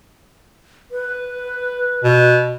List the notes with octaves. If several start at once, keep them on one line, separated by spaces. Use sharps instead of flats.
B4
B2